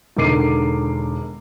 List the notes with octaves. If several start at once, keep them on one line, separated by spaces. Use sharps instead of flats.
E1 D3 D#3 D6 C7 D#7